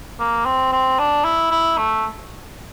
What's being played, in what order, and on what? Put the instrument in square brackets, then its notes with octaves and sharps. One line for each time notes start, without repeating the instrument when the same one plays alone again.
[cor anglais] A#3
C4
C4
D4
E4
E4
A3